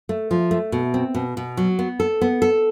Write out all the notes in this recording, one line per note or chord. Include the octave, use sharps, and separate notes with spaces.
A3
F3
A3
B2
C4
B2
B2
F#3
B3
A4
B3
A4